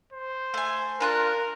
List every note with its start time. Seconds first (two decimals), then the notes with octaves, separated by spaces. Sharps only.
0.13 C5
0.54 A3 G#5
1.00 D4 F4 A#4 F#6